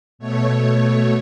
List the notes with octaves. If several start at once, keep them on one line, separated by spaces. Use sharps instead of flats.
B2 A3 C#5